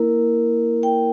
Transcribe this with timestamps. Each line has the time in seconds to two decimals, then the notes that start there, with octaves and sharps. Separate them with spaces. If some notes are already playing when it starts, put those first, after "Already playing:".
Already playing: A#3 E4 A#4
0.83 G5